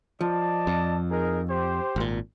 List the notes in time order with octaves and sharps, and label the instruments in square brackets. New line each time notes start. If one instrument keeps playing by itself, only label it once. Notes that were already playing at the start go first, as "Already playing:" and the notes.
[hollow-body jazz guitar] F3 [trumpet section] D5 D#5 A5
[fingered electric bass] F2
[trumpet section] D#4 G#4 A#4
G4 C5
[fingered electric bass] G#1 A#2